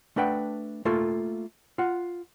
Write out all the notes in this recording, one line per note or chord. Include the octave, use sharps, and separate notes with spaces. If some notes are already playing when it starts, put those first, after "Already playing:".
A3 D4 B4 F#5 G5
A3 A#3 F4 A4
F4 F#5